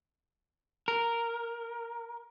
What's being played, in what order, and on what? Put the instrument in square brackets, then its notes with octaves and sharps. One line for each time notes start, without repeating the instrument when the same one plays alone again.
[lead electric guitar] A#4